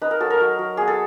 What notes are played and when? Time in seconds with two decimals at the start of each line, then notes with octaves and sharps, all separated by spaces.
0.02 D#4 B4
0.11 A#4
0.20 F#3 A4
0.30 A#4
0.40 F#3
0.59 F#3
0.77 B3 G#4
0.88 A4